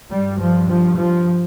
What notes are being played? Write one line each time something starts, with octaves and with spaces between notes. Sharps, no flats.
G2 G3
F3
F3
F3